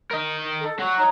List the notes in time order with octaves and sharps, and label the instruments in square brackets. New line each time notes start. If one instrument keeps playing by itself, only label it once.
[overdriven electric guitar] A#4 D#5
[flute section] A4
[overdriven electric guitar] F#3 F#4 [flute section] C#6
[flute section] D#4 C#5 A#5